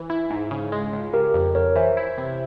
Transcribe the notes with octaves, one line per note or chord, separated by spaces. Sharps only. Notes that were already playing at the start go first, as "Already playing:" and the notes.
Already playing: E3
E4
G#2
C#3
G#3
C#2
C#3 G4 A#4
F2
F2 A#4 C#5
E3 C5 E5
E4
C3